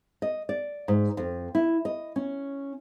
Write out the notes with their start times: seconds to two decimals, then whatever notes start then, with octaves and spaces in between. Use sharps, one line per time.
0.22 D#5
0.49 D5
0.88 G#2
1.17 F2
1.55 E4
1.85 D#5
2.16 C#4